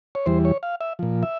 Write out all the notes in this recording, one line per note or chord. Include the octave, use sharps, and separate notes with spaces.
C#5
E2 E3 G3 C5
C#5
F5
E5
A#2 F3
E5